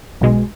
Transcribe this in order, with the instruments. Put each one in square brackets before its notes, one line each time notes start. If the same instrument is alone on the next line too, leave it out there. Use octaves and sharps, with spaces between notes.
[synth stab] B1 B2 G#3